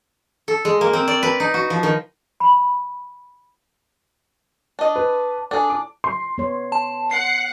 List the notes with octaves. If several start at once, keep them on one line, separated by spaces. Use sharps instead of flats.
A4
G#3
A#3
C4
D5
B4
D#4
F#4
F3
D#3
B5
D4 D#5
B4
D4 G#4 A4
D6
C6
B3 C#5
A5
F#5 C7